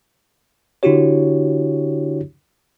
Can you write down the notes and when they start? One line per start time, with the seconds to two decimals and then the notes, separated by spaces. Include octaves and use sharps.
0.83 D3 D4 E4 F#4 G4 C#5